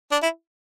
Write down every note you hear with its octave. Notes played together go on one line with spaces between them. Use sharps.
D4
E4